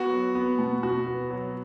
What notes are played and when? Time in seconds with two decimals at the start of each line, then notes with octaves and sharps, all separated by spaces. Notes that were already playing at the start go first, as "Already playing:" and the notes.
Already playing: B3 F#4
0.10 F#3
0.35 B3
0.59 B2
0.83 B2 F#4
1.07 B3
1.31 F#3